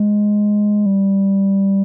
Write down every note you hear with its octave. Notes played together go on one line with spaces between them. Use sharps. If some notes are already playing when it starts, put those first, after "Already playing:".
Already playing: G#3
G3